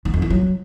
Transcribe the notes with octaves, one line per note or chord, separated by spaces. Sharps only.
D#3
F2
E3
F#3